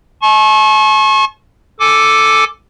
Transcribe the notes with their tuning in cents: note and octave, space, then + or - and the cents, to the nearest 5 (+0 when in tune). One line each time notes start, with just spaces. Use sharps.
A5 -45 C#6 -35
A4 +0 G#5 +10 D6 +0